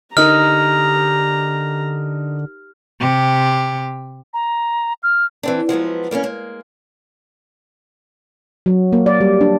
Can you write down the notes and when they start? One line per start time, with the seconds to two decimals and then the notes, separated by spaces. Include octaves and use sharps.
0.17 D3 D#4 G4 A#4 D#5 A#5 F6
2.98 C3 G4
4.34 A#5
5.03 F6
5.43 E3 C4 D4
5.69 F3 F#3 G#3 B3
6.11 G3 A#3 C4 C#4
6.23 G#3 A#3
8.66 F#3
8.93 A#3
9.06 D5
9.21 G3
9.41 D4